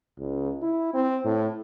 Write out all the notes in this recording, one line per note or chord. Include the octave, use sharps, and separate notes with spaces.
C#2
E4
C4
A2